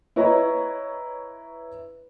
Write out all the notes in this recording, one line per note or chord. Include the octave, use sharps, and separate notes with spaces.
E4 B4 C#5 D#5 A#5